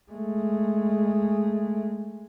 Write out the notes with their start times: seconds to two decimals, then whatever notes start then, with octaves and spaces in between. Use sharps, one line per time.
0.11 G#3 A3